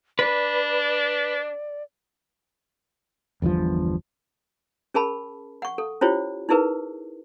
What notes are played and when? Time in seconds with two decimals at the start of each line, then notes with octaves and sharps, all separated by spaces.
0.19 D4 B4 D5
3.42 G1 E2 G2 F3
4.94 C#4 G#4 A#4 A5 B5
5.62 F#5 C#6
5.78 A4
6.01 C#4 E4 F4 G4 C5 C#5
6.49 D#4 E4 G#4 A#4 B4